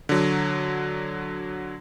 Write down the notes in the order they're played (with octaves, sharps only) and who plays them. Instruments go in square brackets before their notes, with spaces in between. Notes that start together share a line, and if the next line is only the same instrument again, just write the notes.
[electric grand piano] D3 F#3